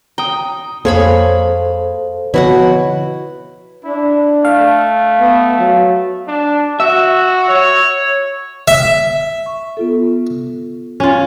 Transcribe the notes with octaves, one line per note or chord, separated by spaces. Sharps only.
G5 A#5 D#6
F2 A#3 G#4 A4 C5 C#5 F5 B5
B2 D3 F3 B3 E4 F#4 C#5 F#5
D4 E4
A3 F5
B3
F#3
D4
F#4 E5
C#5
E5
C#6
B3 F4 A4
C#4 F4